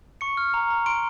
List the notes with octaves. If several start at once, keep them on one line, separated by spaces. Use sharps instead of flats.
C#6 C#7
F6
A#5
A#5
C6 D7